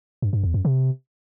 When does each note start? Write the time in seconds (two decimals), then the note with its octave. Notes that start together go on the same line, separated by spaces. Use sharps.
0.22 G2
0.33 G2
0.44 E2
0.54 F#2
0.65 C3